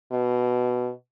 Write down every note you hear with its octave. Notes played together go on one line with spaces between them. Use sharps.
B2